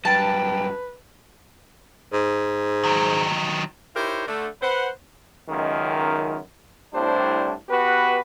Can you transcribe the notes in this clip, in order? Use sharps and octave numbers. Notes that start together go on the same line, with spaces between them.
G2 F#3 B4 G5 A5
G#2
D#3 F#3
D#4 E4 G4 A#4 C5 C#5
D3 A3
B4 C5 F#5
C#2 F#2 D#3
C2 A2 G3 D4 C5
B3 F#4 G4 B4